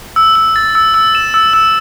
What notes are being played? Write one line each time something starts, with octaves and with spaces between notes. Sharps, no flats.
E6
E6
A6
E6
E6
E7
E6
E6